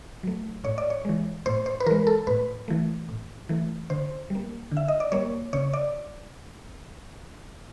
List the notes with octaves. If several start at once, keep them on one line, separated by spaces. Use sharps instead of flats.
F#3 A3
A2 C#5
D5
C#5
E3 G#3
A2 C5
C5
B4
E3 G#3 A#4
A4
A2 B4
E3 A3
A2
E3 A3
D3 C5
G3 A#3
D3
E5
D#5
D5
G3 A#3 C#5
C#3 C#5
D5